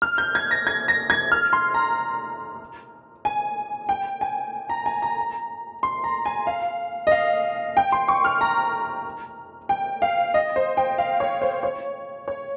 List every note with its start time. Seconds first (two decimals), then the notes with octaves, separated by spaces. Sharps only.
0.02 F6
0.18 G6
0.35 G#6
0.51 A#6
0.67 G#6
0.88 A#6
1.10 G#6
1.32 F6
1.53 C6
1.74 A#5
3.25 G#5
3.89 G5
4.21 G#5
4.69 A#5
4.86 G#5
5.02 A#5
5.83 C6
6.04 A#5
6.26 G#5
6.47 F5
7.07 D#5
7.12 F5
7.77 G5
7.92 C6
8.08 C#6
8.25 F6
8.41 A#5
9.69 G5
10.02 F5
10.34 D#5
10.56 C5
10.77 G5
10.98 F5
11.20 C#5
11.42 C5
11.63 C#5
12.28 C#5